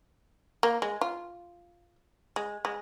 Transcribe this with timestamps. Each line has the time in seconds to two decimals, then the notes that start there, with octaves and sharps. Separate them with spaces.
0.63 A#3
0.82 G#3
1.01 F4
2.36 G#3
2.65 G#3